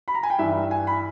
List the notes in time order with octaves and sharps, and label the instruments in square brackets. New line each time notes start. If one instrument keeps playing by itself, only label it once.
[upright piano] B5
A#5
G#5
G5
G2 E3 E5
G#5
B5